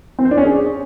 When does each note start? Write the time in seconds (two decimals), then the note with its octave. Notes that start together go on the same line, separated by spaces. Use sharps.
0.19 C4
0.25 C5
0.31 D4
0.38 C#4
0.44 G#4